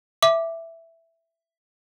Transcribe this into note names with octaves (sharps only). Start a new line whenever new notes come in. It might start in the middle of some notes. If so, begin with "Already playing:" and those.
E5 D6